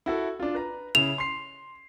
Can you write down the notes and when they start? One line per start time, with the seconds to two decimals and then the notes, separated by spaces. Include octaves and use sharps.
0.06 E4 F#4 A4
0.40 D4 F4
0.55 B4 A#5
0.95 C#3 E4 E7 F7
1.18 C6 C7